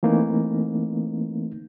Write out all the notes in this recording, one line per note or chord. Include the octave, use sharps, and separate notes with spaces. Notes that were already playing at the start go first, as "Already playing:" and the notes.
E3 A3 A#3 C4 D#4